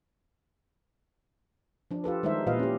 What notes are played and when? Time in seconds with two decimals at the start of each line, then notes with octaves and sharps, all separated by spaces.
1.91 F3 D4
2.04 F4 G4 A4 B4
2.23 D#3 G3 G#3 D#4 C5 E5
2.47 A#2 E3 F4 B4 D#5 F5
2.59 C#4 G4